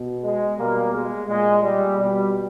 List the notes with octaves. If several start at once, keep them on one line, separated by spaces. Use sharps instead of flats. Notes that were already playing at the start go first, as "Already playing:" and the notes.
Already playing: B2
G#3
B2 G3 A#3
G#3
A#2 G#3
G3
B2 G3